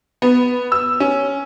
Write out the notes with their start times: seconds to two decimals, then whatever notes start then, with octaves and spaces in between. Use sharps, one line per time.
0.22 B3
0.72 E6
1.00 C#4